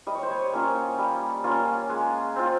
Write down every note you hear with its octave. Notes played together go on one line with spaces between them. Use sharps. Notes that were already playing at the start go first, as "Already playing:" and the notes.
G3 D#5
C#5
C5
C#5
A#3 C#4 F4
G3
A#3 C#4 F4
G#3
C4 F4